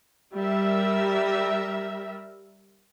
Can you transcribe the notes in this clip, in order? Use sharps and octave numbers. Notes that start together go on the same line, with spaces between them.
G3 A#4 E5